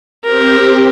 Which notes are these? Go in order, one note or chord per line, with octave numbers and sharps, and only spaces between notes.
C4 G4 A#4